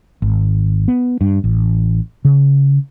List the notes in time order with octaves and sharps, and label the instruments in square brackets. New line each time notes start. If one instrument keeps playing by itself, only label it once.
[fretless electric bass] G#1
B3
G2
A1
C#3